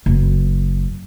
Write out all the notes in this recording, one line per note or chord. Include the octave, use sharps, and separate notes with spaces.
F#1